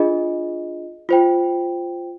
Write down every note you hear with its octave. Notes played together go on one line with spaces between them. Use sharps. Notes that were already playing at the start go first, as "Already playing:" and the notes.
Already playing: D4 F4 G#4 D#5
F4 C5 G5